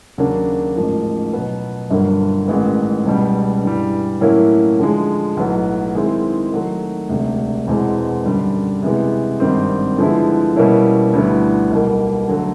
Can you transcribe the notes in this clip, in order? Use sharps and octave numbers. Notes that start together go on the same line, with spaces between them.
D#2 C#3 F#3 A#3 D4
A1 G#2 F3 A#3
B2 F#3 B3
G1 G2 D3 F#3 A#3
A1 G#2 D#3 G#3 B3
C#2 B2 G3
G2 E3 G3
A2 F#3 A#3 C#4 E4
D3 F3 G#3
B1 A2 F#3 B3
D#3 G#3 C4 E4 G#4
D#3 F#3 A3
E1 D2 C3
E1 E2 B2 G#3 C4
F#2 D3 G3
C3 E3 G#3 B3
G#1 G2 D#3 G3 C4
D3 F3 G#3 B3 E4
B2 G3 A#3 C#4 E4
D2 D3 G3 B3 E4
B1 B2 G3 A#3
D3 F#3 A3